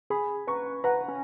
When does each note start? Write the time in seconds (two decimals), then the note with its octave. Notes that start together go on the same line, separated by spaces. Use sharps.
0.10 G#4 G#5 B5
0.47 B4 A#5 C#6
0.84 B4 F#5 A#5
1.08 C#4